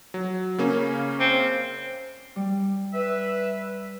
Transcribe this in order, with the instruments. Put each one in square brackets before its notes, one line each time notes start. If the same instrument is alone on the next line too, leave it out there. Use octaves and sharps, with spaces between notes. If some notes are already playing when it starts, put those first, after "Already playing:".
[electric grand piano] F#3
C#3 A#3 C#4
[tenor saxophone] C4
[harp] G3
[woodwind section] B4 E5